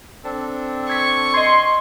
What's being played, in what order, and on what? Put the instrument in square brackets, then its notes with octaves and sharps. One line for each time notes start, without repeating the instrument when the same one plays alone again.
[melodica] C4 D4 A4
[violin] C#6 [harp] G#6 B6
[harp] D#5 G#6 [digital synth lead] C6